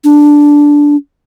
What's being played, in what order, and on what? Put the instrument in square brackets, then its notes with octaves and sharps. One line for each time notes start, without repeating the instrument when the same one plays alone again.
[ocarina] D4